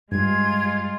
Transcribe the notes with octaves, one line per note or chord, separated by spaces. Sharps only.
G2 G3 G#3 F4 G#6